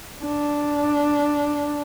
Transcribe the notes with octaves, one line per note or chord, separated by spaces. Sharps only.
D4